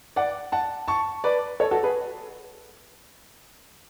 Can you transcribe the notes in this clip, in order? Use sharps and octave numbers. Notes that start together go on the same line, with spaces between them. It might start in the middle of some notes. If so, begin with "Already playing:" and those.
D5 F#5
F#5 A5
A5 C#6
B4 D5
A4 C#5
F#4 A4
G#4 B4